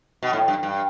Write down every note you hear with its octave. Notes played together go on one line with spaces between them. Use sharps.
B2
A2
G2
G2